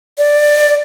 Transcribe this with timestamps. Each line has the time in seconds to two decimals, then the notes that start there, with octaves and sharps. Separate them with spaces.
0.18 D5